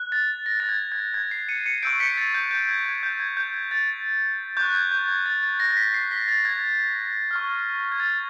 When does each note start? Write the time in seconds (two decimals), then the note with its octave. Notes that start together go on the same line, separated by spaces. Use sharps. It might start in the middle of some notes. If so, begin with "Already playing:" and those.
Already playing: F#6
0.12 A6
0.46 A#6
0.60 A6
0.69 G#6
0.92 G#6
1.14 G#6
1.31 C7
1.49 C#7 D#7
1.66 C#7 D#7
1.83 C#6 E6 G6 C7 D7
2.00 B6 C#7
2.17 A6
2.34 G6
2.51 G6
2.69 G#6
2.85 G#6
3.03 G6
3.20 G#6
3.37 G6
3.54 G#6
3.71 A6
4.57 C#6 F#6 G6
4.74 G#6
4.91 G6
5.08 G#6
5.26 A6
5.43 A6
5.60 A#6
5.71 A#6
5.77 B6
5.94 C7
6.11 B6
6.28 A6
6.45 G#6
7.31 C#6 F6
7.92 G#6
8.00 A6